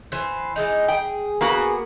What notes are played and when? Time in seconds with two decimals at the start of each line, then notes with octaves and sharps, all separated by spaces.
0.12 E3 B4 C5
0.56 E3 G#3 D#4
0.88 G#4 G5
1.41 A#3 B3 F#4 G#4